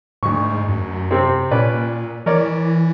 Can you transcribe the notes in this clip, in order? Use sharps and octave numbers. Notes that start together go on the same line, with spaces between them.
D2 G#2 C#6
F#2
C3 C4
A#2 C#4 B4 D5
E3 A#4 C#5 D5